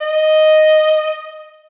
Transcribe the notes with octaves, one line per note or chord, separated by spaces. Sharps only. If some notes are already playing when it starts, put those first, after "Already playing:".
D#5